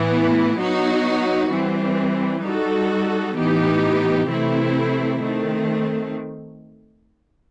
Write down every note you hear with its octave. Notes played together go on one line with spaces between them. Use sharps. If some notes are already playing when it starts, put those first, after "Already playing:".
Already playing: A2 E3 B3 E4
F#3 B3 D#4 F#4
E3 G3 C4
G3 D#4 F#4 A4
A2 E3 B3 D#4 G4
C3 E3 A3 C4 E4
D#3 A3 C4